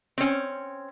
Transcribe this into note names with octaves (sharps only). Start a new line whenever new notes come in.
C4 C#4